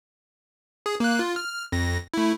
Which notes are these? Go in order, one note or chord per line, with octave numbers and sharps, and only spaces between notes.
G#4
A#3 F#6
F4
F6
F2 A#6
A3 E4